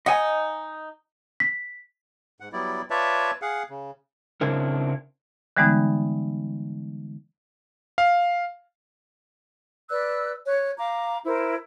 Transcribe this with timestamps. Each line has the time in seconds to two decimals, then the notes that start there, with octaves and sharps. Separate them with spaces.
0.06 D#4 D#5 F#5 G#5
1.40 B6
2.40 G#2 F#5
2.53 F#3 G3 B3 E4 D5
2.90 F4 B4 C#5 D5 E5 A5
3.42 G#4 F5 F#5
3.70 C#3
4.41 C#3 C4 D4 E4 A#4
5.57 D3 E3 G3 G#3 B3 D#4
7.98 F5
9.90 B4 D5 E6 F#6
10.47 C#5 F#6
10.78 F5 A#5 D6
11.25 E4 A#4 C5